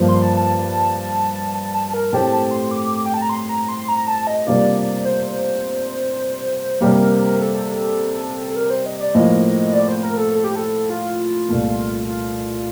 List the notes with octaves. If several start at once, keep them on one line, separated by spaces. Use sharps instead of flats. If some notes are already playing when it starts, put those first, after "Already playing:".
Already playing: G2 F3 A#3
C6
A5
A5
A5
A5
A#4
A2 A3 C4 G4 A5
A5
C6
D6
G5
A5
A#5
C6
A#5
C6
A#5
A5
D#5
C3 G3 A#3 D4 F4 D5
C5
C3 G3 A#3 A#4
A4
A4
A#4
C5
D#5
D5
A2 F3 A#3 D#5
D5
C5
A#4
A4
A4
G4
A4
F4
C2 A#2 A3
F4